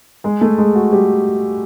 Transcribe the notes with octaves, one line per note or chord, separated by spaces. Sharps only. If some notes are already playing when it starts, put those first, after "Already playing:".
G#3 G#4
A3 A4
G#3 G#4
F#4
G3 G4